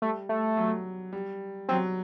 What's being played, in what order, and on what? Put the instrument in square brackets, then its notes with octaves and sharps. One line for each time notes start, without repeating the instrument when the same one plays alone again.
[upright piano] G3 [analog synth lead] A3
[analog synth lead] A3
[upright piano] F#3
G3
[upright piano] F#3 [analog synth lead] C4